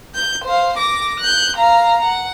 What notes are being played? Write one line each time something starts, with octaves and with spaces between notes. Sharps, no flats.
G6
C5 F5
D6 A#6
F#6 G6
F5 A#5
F#5